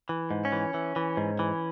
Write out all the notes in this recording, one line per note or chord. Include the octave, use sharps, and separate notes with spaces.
E3
G#2
C#4
E3
E3
E3
G#2
E3